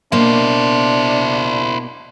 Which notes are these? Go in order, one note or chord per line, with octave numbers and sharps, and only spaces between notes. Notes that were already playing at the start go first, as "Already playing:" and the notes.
B2 A#3 D4 E4 C5